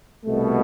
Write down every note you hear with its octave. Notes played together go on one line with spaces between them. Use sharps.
C2 B2 A3